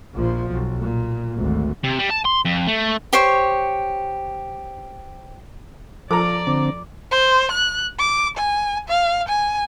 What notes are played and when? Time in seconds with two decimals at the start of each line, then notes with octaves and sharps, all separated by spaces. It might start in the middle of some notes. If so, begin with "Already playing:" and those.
0.14 A#1 F3
0.51 B1
0.81 A#2
1.37 G#1 D2
1.84 C3
1.99 G3
2.10 A5
2.25 C6
2.45 F2
2.67 A3
3.13 G4 C5 C#5 C#6
6.11 F3 A4 A#4 D5 A#5 D6
6.47 D3 C4
7.11 C5
7.51 F#6
7.99 D6
8.37 G#5
8.89 F5
9.28 G#5